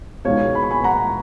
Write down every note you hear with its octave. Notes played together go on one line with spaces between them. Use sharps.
C#2 B2 G#3 D#4 C#5 F5
B5
C#6
G#5 B5
F#5 A#5